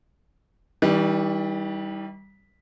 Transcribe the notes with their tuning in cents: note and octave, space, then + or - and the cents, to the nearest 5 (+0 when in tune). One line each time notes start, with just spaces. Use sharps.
E3 -45 G3 +0 D4 +25